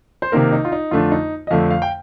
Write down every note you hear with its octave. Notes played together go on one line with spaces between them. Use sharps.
C5
C3 D#3 A#3 A#4
D#4
F4
D#4
F2 D3 A3 D4 F4
D#4
D#5
F2 D3 A3 D4 F5
F5
G5